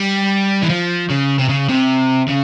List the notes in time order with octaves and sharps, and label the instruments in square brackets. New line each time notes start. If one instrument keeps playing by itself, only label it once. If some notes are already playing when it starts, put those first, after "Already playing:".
Already playing: [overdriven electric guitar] G3
E3
F3
C#3
C3
C#3
C3
C#3